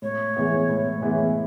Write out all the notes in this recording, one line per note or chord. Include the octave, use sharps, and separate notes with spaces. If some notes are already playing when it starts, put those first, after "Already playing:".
A2 C#5
E3 G#3 B3 E4
A2
E3 G#3 B3 E4